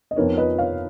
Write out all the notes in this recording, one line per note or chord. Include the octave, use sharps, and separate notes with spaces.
D#5
F2 F3 B3 D#4 A#4 C#5
B4 D#5
C#5 F5